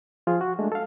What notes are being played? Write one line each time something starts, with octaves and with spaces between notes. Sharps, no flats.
F3 F4 G#4
F#4
G#3 A3 D4
A4 F5